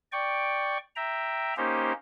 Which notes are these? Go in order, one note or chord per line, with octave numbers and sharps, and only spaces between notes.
D5 G5 C#6
E5 G5 A#5
A#3 C#4 D#4 G4 C5